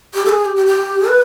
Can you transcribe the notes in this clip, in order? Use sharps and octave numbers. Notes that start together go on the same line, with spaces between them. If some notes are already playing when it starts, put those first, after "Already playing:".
G4
A4
G#4
G4
G4
G4
B4